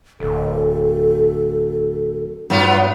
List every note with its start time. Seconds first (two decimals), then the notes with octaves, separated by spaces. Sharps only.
0.20 D1 A4
2.50 G2 F#3 B3 F4